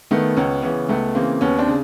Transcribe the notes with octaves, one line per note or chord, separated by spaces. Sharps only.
D#3 A3 B3
C#2 B3 C#4
C#3 E3 B3 C#4
C#2 A3 B3
C#3 E3 A#3 C4
D#2 B3 C#4
C4 D4
C#3